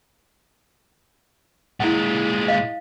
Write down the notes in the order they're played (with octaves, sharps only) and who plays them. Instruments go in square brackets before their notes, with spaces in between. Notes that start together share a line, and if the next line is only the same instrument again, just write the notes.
[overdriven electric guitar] A#2 G#3 [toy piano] E4 F#5
[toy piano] D#5 F5